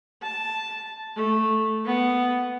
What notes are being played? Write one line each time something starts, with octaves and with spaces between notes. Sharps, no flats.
A5
A3
B3